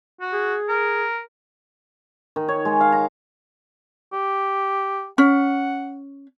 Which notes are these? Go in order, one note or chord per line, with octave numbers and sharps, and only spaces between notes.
F#4
G#4
A#4
D#3
C#5
G#3
F5
A#5
G4
C#4 F#5